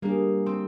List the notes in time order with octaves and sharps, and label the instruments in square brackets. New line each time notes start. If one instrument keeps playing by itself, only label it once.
[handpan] G3 D4 G#4 [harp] A#3
[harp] C4